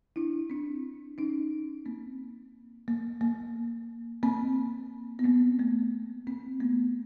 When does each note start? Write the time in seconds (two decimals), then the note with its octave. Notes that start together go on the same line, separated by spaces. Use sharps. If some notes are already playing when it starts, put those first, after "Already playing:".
0.16 D4 E4
0.50 C4 D4
1.18 C#4 D#4
1.86 A#3 C4
2.88 A#3
3.21 A#3
4.23 A#3 C4
5.19 B3
5.24 A#3 C4
5.59 A3 B3
6.27 A#3 C4
6.60 A3 B3